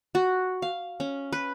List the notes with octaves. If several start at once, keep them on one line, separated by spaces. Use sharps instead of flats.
F#4
F5
C#4
B4